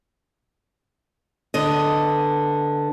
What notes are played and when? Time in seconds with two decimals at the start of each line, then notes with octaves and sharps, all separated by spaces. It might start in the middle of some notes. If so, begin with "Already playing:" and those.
1.54 D3 B3 D#5